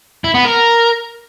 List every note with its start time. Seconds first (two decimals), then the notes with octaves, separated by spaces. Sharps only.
0.24 E4
0.34 B3
0.45 A#4